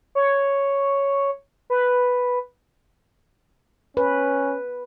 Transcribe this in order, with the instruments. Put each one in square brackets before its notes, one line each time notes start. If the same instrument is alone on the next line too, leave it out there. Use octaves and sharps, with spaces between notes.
[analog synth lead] C#5
B4
[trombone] C#4 [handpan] B4